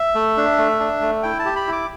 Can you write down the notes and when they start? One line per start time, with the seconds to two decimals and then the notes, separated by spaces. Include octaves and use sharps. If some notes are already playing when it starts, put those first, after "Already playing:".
Already playing: E5
0.15 A3
0.37 D4
0.58 A3
0.80 D4
1.01 A3
1.23 E4 G5
1.39 A5
1.45 G4
1.56 B5
1.68 E4 D6